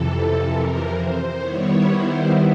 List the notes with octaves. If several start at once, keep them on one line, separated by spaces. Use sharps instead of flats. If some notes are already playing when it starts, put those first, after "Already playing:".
Already playing: F2 C3 E3 A4
A#4
C5
D#3 G3 B3 E4 C#5
C5